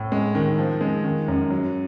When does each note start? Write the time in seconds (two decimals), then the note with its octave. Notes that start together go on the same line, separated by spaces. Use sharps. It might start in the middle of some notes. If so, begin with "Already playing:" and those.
Already playing: A2
0.12 G#3
0.35 D#3
0.58 F3
0.81 G#3
1.05 D#3
1.28 F#2
1.50 F#3